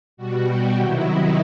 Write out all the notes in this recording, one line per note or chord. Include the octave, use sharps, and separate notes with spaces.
B2 G3 F#4
G4
C3 D#3 F#3 E4
D#4